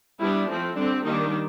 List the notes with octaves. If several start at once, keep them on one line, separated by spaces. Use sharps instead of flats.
G3 B3 D4 E4
F3 A3 C4
D3 G3 C4 D4
D#3 G3 A#3 D4 D#4